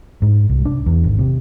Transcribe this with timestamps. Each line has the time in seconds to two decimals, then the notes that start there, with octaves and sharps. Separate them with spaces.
0.22 G#2
0.49 C2
0.65 D4
0.86 E2
1.04 G#1
1.19 C3